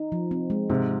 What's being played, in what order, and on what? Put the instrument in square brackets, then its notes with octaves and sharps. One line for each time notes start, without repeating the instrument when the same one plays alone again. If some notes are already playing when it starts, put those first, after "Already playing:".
Already playing: [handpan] D#4
F3
C4
G#3
[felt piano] G#2 C3 [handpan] C4